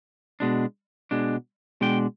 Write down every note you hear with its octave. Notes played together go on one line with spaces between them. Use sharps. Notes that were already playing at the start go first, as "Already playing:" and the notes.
B2 G#3 D4
B2 G#3 D4
B2 G#3 D4 G5